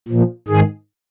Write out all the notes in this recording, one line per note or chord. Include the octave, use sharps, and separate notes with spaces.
A#2 F3
G#2 D#3 G#4